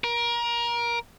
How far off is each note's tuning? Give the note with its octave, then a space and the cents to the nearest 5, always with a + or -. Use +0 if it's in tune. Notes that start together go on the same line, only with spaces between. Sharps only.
A#4 +25